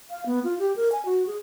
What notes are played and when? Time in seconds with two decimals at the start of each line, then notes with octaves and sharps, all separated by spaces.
0.10 F5
0.26 B3
0.44 F4
0.59 G4
0.76 A#4
0.92 G#5
1.05 F#4
1.27 G#4